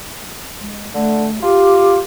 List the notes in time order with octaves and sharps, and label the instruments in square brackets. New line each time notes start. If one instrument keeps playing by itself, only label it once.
[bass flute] G#3
[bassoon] D3 [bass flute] A3
[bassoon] F4 [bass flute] G4